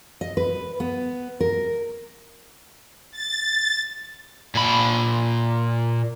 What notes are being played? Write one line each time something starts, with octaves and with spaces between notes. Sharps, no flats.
D#5
B4
B3
A#4
A6
A#2 B5